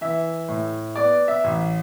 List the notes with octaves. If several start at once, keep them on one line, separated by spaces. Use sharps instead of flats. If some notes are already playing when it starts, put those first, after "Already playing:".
E3 E5
A2
B3 D5
E5
A1